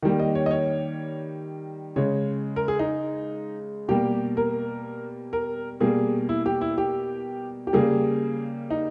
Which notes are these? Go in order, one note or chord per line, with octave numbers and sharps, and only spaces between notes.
D#3 G3 A#3
D#5
C#5
D#5
C#5
C#3 G#3 C#5
A#4
G#4
D#4
B2 G3 A#3 G4
A#4
A#4
B2 G3 A#3 G#4
E4
G4
E4
G4
G4
C#3 G3 A#3 G#4
D#4